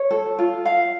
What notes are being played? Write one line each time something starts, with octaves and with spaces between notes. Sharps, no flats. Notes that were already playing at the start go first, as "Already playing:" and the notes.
Already playing: C#5
A4
F4
F5